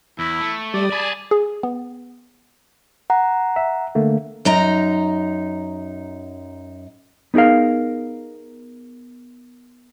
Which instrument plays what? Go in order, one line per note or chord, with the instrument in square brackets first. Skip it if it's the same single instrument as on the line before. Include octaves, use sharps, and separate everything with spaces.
[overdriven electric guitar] E2 [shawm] E4
[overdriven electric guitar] A3
[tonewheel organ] G3 D#6 [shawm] D5
[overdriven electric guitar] G#4 [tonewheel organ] G#5 A5 B5
[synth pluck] G#4
B3
[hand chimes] F#5 A#5
[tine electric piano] E5
D3 A3 A#3
[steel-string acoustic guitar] F#2 D#4 A#5
[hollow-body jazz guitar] B3 D#4 G#4 A#4 F5